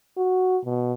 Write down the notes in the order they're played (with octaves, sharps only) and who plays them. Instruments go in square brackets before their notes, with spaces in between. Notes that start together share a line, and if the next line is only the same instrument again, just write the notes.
[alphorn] F#4
B2